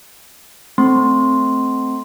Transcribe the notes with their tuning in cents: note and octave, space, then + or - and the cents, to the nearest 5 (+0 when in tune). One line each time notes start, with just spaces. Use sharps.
A3 +0 C4 -5 C6 +0